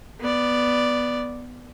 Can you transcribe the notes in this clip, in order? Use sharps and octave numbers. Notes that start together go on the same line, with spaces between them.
B3 D5